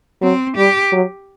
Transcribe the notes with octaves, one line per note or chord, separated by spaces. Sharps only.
F#3 C4
G3 G4
F#3